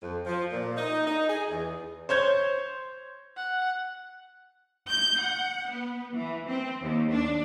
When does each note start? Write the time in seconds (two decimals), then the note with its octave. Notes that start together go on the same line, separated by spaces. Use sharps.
0.03 F2
0.26 F3
0.51 A#2
0.76 D#4
1.06 D#4
1.29 G#4
1.50 E2
2.09 C5 C#5 G6 G#6
3.37 F#5
4.89 G6
5.20 F#5
5.69 B3
6.13 E3
6.47 C4
6.81 D#2
7.12 D4